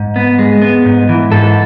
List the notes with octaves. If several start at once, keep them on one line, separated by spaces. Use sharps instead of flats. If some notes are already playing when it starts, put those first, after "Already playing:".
Already playing: G#2
B3
G#3
B3
G#2
E3
G#2 A4